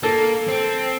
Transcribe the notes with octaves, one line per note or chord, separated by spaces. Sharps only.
A#3 A4
C4